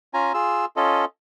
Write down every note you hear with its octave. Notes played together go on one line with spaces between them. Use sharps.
C#4 F4 G#5 A#5
F4 G#4 E6
C#4 F4 A4 D#5